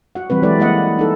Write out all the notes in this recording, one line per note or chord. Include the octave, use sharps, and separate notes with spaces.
F#4 F#5
E3 G3 C4 B4
F#3 G#3 E4 A4 B4 D5
A#3 E4 D#5 F#5
D#4 A4